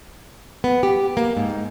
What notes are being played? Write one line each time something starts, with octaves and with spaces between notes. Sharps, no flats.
B3
G4
A#3
G#2